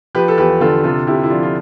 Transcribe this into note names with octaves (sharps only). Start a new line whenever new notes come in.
F3 G4 B4
A4
E2 G4 B4
D3 F4 A4
C3 F4 A4
C3 E4 G4
E4
F3 D4 F4
F4